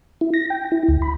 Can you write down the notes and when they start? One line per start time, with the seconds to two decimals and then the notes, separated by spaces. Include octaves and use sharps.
0.21 E4
0.34 A#6
0.50 G5
0.72 E4
0.88 D2
1.02 B5